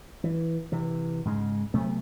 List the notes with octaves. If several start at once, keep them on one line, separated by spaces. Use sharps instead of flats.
E3
C3 E3
G#2 C#3 G#3
C3 F#3 A3 B3